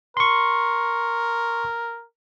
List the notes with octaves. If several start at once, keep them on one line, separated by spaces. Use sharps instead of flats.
A#4 C6 C#6